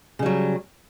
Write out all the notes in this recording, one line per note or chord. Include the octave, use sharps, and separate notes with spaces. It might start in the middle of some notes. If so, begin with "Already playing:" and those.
C#3 F#3 G3